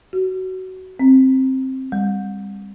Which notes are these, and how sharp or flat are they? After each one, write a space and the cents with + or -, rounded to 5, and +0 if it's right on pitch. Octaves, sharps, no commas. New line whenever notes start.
F#4 +20
C4 +10
G3 +35